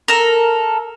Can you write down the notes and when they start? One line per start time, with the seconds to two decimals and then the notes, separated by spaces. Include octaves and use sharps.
0.08 A4 A#4